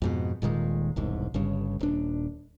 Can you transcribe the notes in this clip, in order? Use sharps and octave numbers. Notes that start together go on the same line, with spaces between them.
F2 G#2 B2
D#1 A#2 D#3 G#3
E1 C2 G#2
G1 G2 C#3
D#1 D4